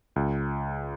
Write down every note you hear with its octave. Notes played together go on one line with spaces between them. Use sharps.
C#2